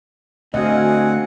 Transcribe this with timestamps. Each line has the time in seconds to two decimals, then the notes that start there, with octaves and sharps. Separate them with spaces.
0.54 D2 C4 F#4 D#5 F5 F#5 G#5